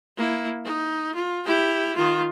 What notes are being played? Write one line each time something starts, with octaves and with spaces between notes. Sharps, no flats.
A#3 E4
D#4
F4
E4 G4
D#3 F4